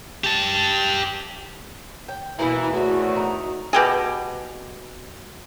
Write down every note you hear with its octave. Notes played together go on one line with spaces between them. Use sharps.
G4 A5
G5
B2 E3 A#3 E4
E2 A2 A3 F#4
D#4
B2 G4 G#4